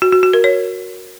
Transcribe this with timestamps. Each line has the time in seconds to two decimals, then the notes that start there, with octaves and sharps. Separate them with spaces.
0.02 F#4
0.12 F#4
0.23 F#4
0.33 A#4
0.44 C#5